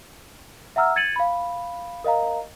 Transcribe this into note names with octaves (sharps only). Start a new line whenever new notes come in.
E5 F#5 A#5 E6 F6
G#6 A6 C#7 D#7 F#7
F5 B5
A#4 D#5 F5 A#5